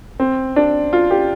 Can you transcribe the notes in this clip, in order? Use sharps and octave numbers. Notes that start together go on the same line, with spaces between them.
C4
D4
F4
G4